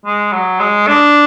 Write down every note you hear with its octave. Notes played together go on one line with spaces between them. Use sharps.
G#3
F#3
G#3
D4